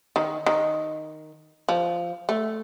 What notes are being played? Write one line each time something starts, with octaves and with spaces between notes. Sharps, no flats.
D#3
D#3
F3
A3